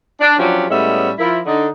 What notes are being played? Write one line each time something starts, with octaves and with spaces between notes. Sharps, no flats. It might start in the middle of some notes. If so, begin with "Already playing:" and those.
D4
F3 F#3 C#4 D4 G4
A2 G3 G#3 B3 C#4 E5
F3 E4 A#4
D3 D#4